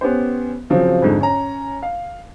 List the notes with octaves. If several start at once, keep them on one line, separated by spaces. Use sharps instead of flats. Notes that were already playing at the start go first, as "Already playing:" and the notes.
B3 C#4 G4 C5
C#3 F3 F#3 C4
F2 G#2 D3
C#4 A#5
F5